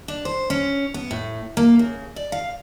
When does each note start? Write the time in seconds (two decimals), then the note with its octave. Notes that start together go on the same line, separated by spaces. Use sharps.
0.08 D4
0.25 C5
0.50 C#4
0.94 B3
1.11 A2
1.57 A#3
1.79 C#3
2.16 D5
2.32 F5